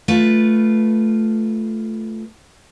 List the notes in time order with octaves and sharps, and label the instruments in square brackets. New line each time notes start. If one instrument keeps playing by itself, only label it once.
[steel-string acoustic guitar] A3 F4 B4